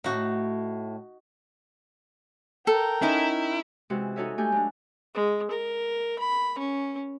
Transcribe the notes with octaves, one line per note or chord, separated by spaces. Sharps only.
A2 A3 D#4 F#4
A4 A#4 G5
C#4 D#4 E4
C3 E3 G#3 C#4 F#4
D#4 F#4 A4 C#5 D#5 E5
A3 D#4 G4 G#5 G6
F#3 A3 D4
G#3
A#4
B5
C#4